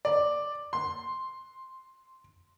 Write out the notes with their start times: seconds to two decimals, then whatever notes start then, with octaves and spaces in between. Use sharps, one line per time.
0.05 D5
0.73 C6